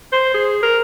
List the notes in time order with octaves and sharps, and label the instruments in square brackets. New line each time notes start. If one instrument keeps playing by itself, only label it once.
[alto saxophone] C5
G#4
A#4